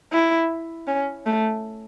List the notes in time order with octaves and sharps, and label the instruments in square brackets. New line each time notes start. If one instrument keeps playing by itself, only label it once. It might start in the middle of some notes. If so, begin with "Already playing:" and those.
[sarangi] E4
C#4
A3